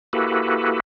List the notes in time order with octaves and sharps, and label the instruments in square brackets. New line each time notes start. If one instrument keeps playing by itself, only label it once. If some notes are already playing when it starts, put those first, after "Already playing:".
[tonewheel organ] A#3 E4 F#4 G4 A4 B4